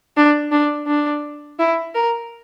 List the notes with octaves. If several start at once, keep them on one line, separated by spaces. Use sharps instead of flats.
D4
D4
D4
E4
A#4